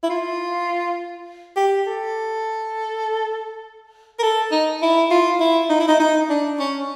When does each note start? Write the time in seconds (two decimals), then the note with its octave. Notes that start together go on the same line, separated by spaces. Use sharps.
0.03 E4
0.10 F4
1.56 G4
1.87 A4
4.19 A#4
4.23 A4
4.51 D#4
4.82 E4
5.10 F4
5.40 E4
5.70 D#4
5.80 E4
5.88 D#4
5.99 D#4
6.29 D4
6.59 C#4